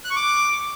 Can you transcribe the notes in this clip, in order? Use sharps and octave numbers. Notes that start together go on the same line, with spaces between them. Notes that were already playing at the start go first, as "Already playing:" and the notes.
F#6
C#6
D6